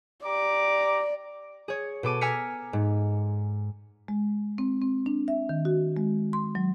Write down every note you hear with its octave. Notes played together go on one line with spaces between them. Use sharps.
G4 D5 A#5 D6
G#4 C#5
B2 A4 D6 D#7
G#5 A#5 E6 F6 B6 C#7
G#2
G#3
C4
C4
D4
E5
D#3
F#4
G#3
C6
F#3